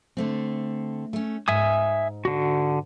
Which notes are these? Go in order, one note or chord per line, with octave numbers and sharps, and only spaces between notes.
D3 A3 C4
A3 C#4
G#2 E5 G#5 D#6
D3 F#4